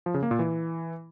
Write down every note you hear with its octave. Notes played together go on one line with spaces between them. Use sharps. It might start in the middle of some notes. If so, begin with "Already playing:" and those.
F3
C#3
A#3
A#2
E3